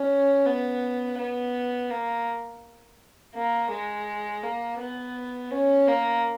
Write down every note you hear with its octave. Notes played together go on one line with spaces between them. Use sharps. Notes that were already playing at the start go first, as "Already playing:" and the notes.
Already playing: C#4
B3
B3
A#3
A#3
G#3
A#3
B3
C#4
A#3